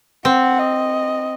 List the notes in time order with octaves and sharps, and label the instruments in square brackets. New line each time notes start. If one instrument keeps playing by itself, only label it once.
[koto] C4 [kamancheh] F#5
[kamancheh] D#5